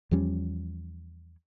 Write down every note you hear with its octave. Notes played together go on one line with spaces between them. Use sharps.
E2 F3 G3 C#4